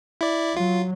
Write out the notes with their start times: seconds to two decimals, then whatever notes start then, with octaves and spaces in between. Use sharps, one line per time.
0.21 E4 D5
0.57 F#3 F4